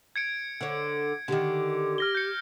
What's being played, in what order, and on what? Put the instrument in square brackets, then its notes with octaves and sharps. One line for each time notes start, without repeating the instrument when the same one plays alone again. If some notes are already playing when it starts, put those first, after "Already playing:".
[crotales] G#6 C#7 D7
[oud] D3 C#5
[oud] D3 D#3 [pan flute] G4
[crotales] F6 A#6 G7
G6 C#7